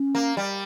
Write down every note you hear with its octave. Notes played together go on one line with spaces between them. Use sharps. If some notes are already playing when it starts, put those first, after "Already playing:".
Already playing: C#4
A#3
G3